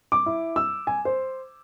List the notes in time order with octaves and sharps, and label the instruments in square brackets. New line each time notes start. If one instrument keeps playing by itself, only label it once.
[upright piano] D6
E4
E6
G#5
C5